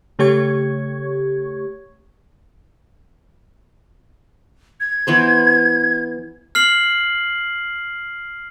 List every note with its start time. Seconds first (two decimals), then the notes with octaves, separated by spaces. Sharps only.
0.19 C#3 A3 G4 C#5 C#6 G#6
4.80 G#6
5.07 E3 B3 C5
6.55 F6 C7 F#7